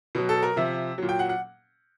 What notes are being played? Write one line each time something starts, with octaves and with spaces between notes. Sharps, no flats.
B2 F#3
A4
A#4
C3 F3 E5
A#2 F#3
G5
F#5
F#5